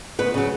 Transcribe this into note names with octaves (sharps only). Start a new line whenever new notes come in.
D2 B3 B4
C#3 F#3